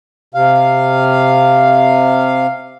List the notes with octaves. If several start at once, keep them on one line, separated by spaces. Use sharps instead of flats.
C3 F5